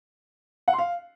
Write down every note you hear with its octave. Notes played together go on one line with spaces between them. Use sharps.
F#5
C6
F5